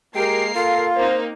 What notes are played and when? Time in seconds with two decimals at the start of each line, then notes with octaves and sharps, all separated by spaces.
0.15 G#3 A#3 G4 A#4 G5 C7
0.55 F4 A4 F5
0.96 A#3 C4 D#4 C5